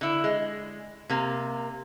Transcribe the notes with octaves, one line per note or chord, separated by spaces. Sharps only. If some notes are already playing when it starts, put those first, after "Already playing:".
D3 E4
G#3
C3 A#3